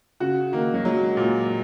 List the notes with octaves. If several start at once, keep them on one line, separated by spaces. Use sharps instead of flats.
C#3 F#4
D#3 A#3
F#3
F#3 G#3
A#2